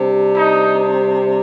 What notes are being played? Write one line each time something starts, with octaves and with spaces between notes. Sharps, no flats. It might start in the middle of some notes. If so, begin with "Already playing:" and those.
Already playing: C3 G3 D4
D#4